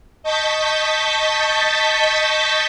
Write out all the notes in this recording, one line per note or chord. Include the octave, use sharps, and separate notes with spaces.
D#5 A5 C#6 G6 A6 B6